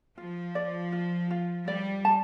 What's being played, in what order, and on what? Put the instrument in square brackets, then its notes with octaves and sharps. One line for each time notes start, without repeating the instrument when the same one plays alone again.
[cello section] F3 [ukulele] F4
[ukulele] D5
F4
F4
[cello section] G3 [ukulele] D5
[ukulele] A5